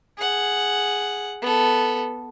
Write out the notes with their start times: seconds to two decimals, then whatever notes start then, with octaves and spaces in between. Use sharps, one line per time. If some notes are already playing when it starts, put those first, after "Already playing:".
0.18 G#4 F#5
1.42 B3 A4